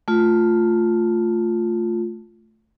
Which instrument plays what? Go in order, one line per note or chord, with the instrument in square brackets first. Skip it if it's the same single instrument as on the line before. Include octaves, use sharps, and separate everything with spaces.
[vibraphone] A3 F4